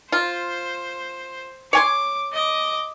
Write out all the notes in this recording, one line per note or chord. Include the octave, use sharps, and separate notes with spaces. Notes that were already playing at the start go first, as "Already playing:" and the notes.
F4 C5
C#5 G#5 C6 D6
D#5 D6